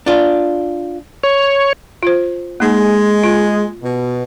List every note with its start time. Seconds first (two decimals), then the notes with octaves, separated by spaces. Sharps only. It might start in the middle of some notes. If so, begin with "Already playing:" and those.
0.06 D4 F4
1.23 C#5
2.03 F4 C5
2.60 G#3 A#3 D#4 G#4
3.23 F4
3.82 B2